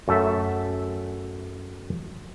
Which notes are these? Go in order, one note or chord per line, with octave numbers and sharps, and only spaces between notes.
F#2 A3 A4 E5